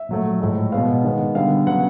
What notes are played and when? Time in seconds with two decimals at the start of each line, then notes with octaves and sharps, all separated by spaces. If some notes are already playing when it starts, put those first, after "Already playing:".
Already playing: E5
0.09 A#2 F#3 A3
0.40 A2 F3 G#3
0.72 B2 G#3 B3 F5
1.04 D#3 G#3 B3
1.35 D3 G3 B3 F5
1.67 C#3 F#3 B3 F#5